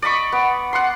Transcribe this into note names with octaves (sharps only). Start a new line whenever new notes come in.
D5 D#5 B5 C#6
B3
F#5 C6